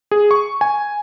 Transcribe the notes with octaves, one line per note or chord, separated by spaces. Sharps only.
G#4
C#6
G#5